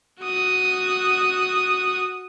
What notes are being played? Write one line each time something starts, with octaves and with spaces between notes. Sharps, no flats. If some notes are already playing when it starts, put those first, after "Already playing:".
F#4 D#6